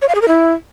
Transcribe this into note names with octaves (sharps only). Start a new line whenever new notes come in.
C#5
F5
G#4
A#4
E4